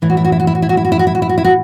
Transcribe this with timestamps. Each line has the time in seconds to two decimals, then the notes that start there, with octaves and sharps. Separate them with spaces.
0.02 A2 E3 E4
0.10 F#4
0.17 E4
0.25 F#4
0.32 E4
0.40 F#4
0.47 E4
0.55 F#4
0.62 E4
0.69 F#4
0.77 E4
0.85 F#4
0.92 E4
0.99 F#4
1.07 E4
1.15 F#4
1.22 E4
1.29 F#4
1.38 E4
1.45 F#4